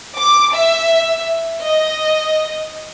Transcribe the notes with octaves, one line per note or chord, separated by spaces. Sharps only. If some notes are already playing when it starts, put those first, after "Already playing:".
D6
E5
D#5